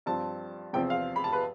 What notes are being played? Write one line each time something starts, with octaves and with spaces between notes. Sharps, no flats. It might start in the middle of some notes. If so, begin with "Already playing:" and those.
G2 F3 C4 A5
E2 C3 F3 C4 G5
F5
B5
A5
B4